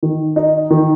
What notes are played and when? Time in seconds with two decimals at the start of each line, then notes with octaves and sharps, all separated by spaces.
0.03 D#3
0.36 D#4
0.70 D#3